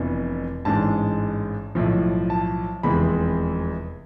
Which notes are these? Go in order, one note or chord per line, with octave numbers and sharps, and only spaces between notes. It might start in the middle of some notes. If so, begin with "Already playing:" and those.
Already playing: F1 F2 E3 B3 D4
A1 G#2 G#3 D4 A5
B1 A2 F3
A5
F1 E2 C3 G#3 C4 B5